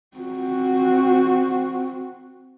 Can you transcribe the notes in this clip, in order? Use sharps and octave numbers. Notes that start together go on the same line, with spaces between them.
C4 F#4